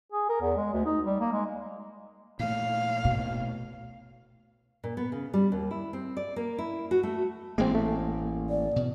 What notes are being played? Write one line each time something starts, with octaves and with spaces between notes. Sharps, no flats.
G#4
A#4
E2
G#3
D2
D#4
G3
A#3
G#3
A#2 A3 F5
B2
A#2
B3
C#3
G3
D#2
E4
C4
D5
A#3
E4
F#4
A3
A1 G#3 A#3 C4
A3
D5
B2